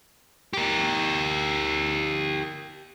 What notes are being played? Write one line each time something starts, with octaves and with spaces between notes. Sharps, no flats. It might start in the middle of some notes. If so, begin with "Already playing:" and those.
G4 A#4